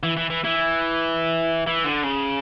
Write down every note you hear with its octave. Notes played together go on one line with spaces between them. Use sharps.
E3
E3
E3
E3
E3
D3
C#3